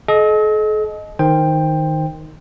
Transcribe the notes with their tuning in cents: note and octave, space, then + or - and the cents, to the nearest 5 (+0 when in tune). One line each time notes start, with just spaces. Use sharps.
A4 -45 D#5 +0
D#3 +0 C5 +0 G5 +15